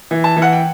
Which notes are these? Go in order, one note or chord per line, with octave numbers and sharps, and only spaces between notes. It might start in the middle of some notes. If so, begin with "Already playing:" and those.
E3
A5
E3
F#5
G5